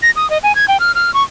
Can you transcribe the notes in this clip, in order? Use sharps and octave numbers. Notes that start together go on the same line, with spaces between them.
A#6
D#6
D#5
G#5
G#6
G5
F6
F6
C#6